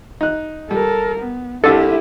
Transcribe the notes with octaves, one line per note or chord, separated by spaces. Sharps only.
D#4 F#6
G3 A4 A#4
B3
C2 D4 E4 G4 A4